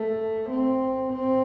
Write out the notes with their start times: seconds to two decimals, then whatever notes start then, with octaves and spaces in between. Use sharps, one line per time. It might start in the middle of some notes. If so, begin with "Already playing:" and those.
Already playing: A3
0.50 C4
1.13 C4